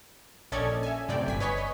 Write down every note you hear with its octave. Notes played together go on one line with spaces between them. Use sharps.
A#1 C#4 A4 D5 D#5 G#6
E5 G#5
F#2 A2 C3 D5 G5
G1 G#5 B6
B4 C#5 D#5 G#5 C#6 B6
C#5 D#5